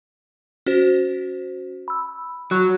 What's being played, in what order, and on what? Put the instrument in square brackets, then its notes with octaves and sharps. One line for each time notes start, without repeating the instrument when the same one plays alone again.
[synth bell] C#4 F#4 C5
B5 E6
[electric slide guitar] F#3 [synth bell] C#6 F#6